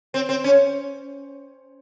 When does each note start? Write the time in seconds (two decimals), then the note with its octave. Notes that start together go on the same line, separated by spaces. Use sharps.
0.14 C4
0.29 C4
0.44 C#4